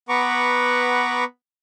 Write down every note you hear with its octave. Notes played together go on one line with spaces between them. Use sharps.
B3 B4 F#5 A#5 C#6 D6